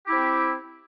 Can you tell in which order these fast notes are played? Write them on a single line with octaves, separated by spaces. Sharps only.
G4 E4 C4